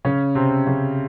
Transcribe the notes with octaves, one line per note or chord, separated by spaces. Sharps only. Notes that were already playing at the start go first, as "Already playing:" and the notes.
C#3 C#4
C3 C4
C#3 C#4